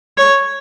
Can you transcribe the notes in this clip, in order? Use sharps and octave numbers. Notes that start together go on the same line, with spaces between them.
C#5